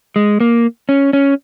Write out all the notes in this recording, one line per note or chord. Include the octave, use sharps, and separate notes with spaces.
G#3
A#3
C#4
C#4